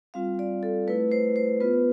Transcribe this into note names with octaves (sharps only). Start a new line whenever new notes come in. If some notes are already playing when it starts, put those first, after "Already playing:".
G3 C4 F4 F5
D5
A4
A3 E4 B4
C5
C5
B3 F4 B4